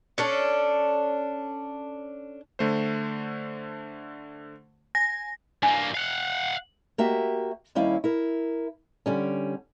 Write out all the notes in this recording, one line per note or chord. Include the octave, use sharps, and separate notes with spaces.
C#4 D4 A4
D3 A3 C5
G#5 A#6
G2 A#3 G#5
F5 F#5
A#3 F#4 G4 E5
D#2 G3 C#4 E4 F5
E4 A#4
D3 G3 C#4